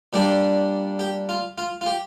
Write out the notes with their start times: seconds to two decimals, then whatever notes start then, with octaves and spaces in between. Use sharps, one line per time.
0.13 A#2 G3 D4 G4
0.99 G4
1.29 F4
1.58 F4
1.81 F4
1.86 G4